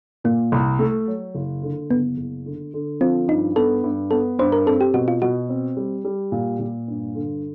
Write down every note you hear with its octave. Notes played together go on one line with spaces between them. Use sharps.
A#2 A#3
C2
A3
F#3
F#1
D3
F#1 B3
F#1
D3
D3
F3 C4
G2 D#4
B3 A4
G2
B3 A4
G2 C5
A#4
C4 A4
G4
B2 F#4
F4
B2 F#4
C4
G3
G3
A#2
A#2
G2
D3